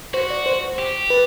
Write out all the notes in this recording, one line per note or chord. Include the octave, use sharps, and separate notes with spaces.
F#4 C5
D5
C5
G4
B4